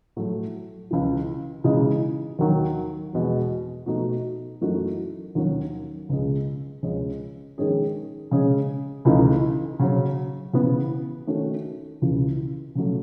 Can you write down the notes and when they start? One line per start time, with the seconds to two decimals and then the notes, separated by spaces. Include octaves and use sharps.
0.16 A2 F#3 A3
0.91 C#2 C#3 E3
1.64 C#3 E3 G#3 D#4
2.39 D#2 D#3 F#3
3.13 E2 B2 G#3
3.86 B2 A3 D#4 F#4
4.61 F#2 E3 A3 D#4 F#4
5.35 D#2 D#3 F#3 C#4 F#4
6.09 C#2 C#3 G#3
6.83 C#2 C#3 G#3 C#4
7.58 D#3 G#3 C#4 G#4
8.31 C#3 G#3 C#4 G#4
9.05 C#2 C#3 E3 A3 D#4
9.79 C#3 F#3 C#4
10.53 C#3 E3 B3
11.27 D#3 A3 C#4 F#4
12.02 C#2 C#3 E3
12.75 C#3 F#3 A3